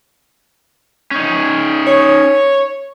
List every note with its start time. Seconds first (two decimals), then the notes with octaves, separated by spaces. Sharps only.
1.11 C#4 D#4
1.87 C#5